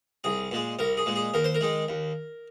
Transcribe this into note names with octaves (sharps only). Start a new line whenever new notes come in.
C2 G#4
A#2 G#3
C2 A#4
G#4
A#2 G#3
G#4
D#2 A#4
C5
A#4
D#3 G#3
D#2